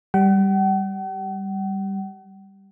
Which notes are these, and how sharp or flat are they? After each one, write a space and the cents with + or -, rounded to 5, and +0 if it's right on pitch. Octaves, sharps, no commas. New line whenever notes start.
G3 +0 F#5 +45